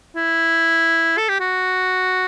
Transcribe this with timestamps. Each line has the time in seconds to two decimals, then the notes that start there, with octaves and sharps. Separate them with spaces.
0.16 E4
1.18 A4
1.29 G4
1.40 F#4